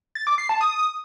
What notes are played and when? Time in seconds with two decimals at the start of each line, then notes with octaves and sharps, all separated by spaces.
0.15 A6
0.27 D6
0.38 C7
0.49 A5
0.61 D#6